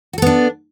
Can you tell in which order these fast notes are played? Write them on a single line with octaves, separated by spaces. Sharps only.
F#4 A4 B3 D4